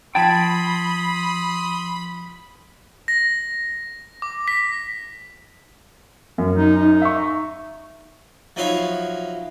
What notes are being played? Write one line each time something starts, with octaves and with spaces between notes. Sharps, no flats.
F3 G5 A5 B5 C6 D#6 G#6 A6
A#6
D6
B6
F#2
D#4
D#4
E5 C#6
F3 F#3 D#4 E4 C#5 F5